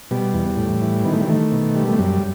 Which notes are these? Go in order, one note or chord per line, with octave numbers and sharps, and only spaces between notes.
B2 G3
E2
A2
E3
D#3 B3
A3
G3
D#3 A3
B2
G3
A3
F#2 G3